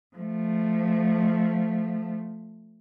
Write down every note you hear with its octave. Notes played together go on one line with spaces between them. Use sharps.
F3 A3